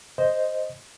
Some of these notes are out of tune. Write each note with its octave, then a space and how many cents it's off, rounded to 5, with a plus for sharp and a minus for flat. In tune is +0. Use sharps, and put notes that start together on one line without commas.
C5 +0 D#5 +0